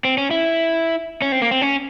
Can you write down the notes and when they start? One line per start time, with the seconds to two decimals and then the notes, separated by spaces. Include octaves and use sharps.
0.05 C4
0.18 C#4
0.31 E4
1.22 C#4
1.32 C4
1.42 A#3
1.51 C4
1.61 C#4